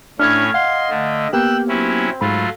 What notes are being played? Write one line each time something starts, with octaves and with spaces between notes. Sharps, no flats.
A2 C#4 D4 E4 C#5 F6 G#6
D#5 F5 F#5 C6
D3 A3
A#3 B3 G4 G5 E6 F#6
F#3 C4 C#4 E4
G#2 F#3 A3 F4 B5